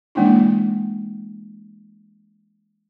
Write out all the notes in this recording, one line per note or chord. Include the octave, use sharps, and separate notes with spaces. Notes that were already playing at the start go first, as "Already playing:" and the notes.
E3 G#3 A#3 C#4 D4 E4